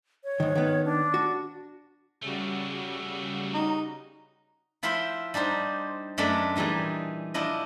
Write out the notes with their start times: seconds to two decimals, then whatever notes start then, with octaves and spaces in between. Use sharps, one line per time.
0.24 C#5
0.40 G#2 D#3
0.55 D#3 B3
0.85 D4
1.14 F#4
2.22 C#3 G3 A3 A#3 F#4
3.54 D#4
4.83 F3 E4 E5 F5 G5 C6
5.34 G3 D4 D#4 C5
6.18 F#2 G#3 A3 B3 D4
6.56 A#2 E3 G3 D#4 G#4
7.34 F3 D4 E4 D#5